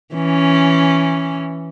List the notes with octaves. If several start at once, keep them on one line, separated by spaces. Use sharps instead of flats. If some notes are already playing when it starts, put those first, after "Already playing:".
E3 C#4